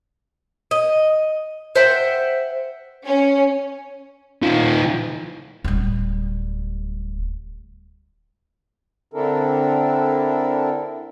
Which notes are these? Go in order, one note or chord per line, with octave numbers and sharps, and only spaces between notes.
D#5
C5 E5 F#5 G5
C#4
D#3 F4
D1 G3
D3 C4 D4 E4 A4 A#4